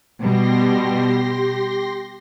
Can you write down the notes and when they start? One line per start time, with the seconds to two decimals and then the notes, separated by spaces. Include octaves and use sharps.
0.21 B2 G3 G4 C6 A#6